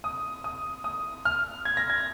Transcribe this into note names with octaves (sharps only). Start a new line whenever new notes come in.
D#6
D#6
D#6
F6
G#6
A#6
G#6